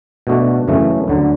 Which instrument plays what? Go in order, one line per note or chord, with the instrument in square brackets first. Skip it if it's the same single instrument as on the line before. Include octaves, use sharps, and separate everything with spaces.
[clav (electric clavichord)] B2 A3 D4 F#4
F#2 C#3 E3 A3
D2 D3 F#3